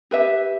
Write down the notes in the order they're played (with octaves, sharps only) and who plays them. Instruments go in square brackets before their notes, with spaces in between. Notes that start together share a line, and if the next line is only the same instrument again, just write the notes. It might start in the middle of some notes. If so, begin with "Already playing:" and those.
[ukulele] G4 B4 E5